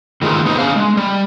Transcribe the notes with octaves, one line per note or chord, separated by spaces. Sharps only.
A2 D#3 G#3 F4 G#4
B3 D#4 G#4 A4 C5 D#5
C#4 D4 F5
G#3
G3